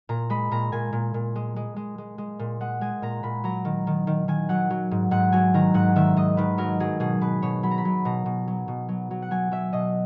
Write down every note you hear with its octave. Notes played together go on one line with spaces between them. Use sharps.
A#2 A#5
G#3 B5
A#2 A#5
A#2 G#5
A#2
A#2
G#3
G#3
G#3
G#3
G#3
A#2
G#3 F#5
G#3 G#5
A#2 A#5
A#2 B5
F#3 A#5
D#3
D#3
D#3
D#3 G#5
F#3 F#5
F#3
G#2
G#2 F#5
F#3 G#5
D#3 A#5
G#2 F#5
D#3 E5
G#2 D#5
D#3 B4
F#3 A#4
F#3 G#4
B2 G#4
B2 B4
B2 C#5
F#3 B5
A#5
B5
F#3
B2 A#5
B2
F#3
B2
F#3
F#3
F#5
F#3 G#5
F#3 E5
B2 D#5